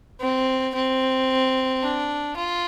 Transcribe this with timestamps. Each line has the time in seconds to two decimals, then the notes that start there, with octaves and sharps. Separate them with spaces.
0.21 C4
0.75 C4
1.83 D4
2.36 F4